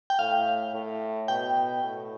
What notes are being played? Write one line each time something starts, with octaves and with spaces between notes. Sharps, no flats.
G5
A2 F5
A2
B2 G5
A2